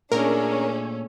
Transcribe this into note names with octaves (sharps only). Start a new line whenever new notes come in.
A#2 A3 C#4 D4 G#4 A#4